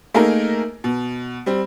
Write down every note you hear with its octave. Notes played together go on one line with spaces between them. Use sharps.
A3 A#3 D#4 G#4 A#4
B2
G3 C4